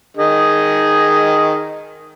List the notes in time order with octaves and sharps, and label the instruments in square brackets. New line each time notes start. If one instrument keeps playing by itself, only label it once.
[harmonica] D#3 G#4 D#5